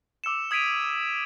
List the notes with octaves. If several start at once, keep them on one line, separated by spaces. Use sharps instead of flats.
D6 E6 C#7 E7
D#6 G#6 B6 D7 D#7 F7